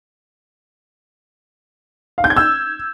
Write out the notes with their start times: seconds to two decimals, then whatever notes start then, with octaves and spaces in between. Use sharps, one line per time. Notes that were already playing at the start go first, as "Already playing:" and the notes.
2.18 F5
2.24 G6
2.30 G#6
2.36 E6